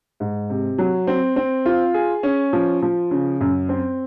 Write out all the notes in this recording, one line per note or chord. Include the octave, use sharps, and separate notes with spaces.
G#2
C3
F#3
C4
C4
F4
G#4
C#4
F3
F3
C#3
F#2
C4